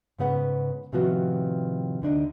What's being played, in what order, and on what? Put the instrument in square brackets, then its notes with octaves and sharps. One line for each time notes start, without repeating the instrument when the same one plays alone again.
[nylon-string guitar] G#2 C#3 B3 F#5
A2 C3 D#3 F3 B3 F#4
D2 D3 D4 D#4